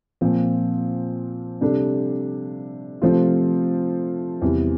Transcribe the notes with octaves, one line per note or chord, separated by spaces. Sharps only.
A#2 F3 C4
C3 G3 D4 A4
C3 F3 A3 C4 F4
E2 C3 G3